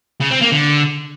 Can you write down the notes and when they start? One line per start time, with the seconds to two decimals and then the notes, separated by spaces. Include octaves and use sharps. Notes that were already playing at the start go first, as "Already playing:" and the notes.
0.20 C#3
0.31 C4
0.41 A#3
0.51 D3